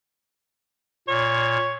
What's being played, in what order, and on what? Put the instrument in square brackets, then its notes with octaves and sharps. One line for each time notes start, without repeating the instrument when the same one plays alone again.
[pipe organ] A#2 [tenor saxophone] C#5